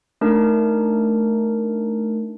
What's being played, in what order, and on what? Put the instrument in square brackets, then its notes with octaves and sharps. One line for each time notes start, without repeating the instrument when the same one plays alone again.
[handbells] A3 D4 D#4 A#4